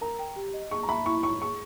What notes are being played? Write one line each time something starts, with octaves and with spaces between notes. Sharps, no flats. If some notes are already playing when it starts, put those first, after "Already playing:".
A#4 A#5
G5
G4
D#5
G#4 C#6
A#5
E5 B5
E4 C#6
C#5 C#6
G#4 C#6